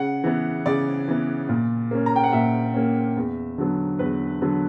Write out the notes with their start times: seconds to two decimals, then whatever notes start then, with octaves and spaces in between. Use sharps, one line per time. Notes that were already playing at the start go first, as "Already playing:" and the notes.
Already playing: C#3 F#5
0.24 E3 B3
0.66 C#3 D5
1.08 E3 B3
1.49 A#2
1.91 A#3 C#4
2.06 A#5
2.16 G5
2.24 F#5
2.33 A#2 E5
2.74 A#3 C#4
3.17 E2
3.58 D3 F#3 B3
3.99 E2 B4
4.42 D3 F#3 B3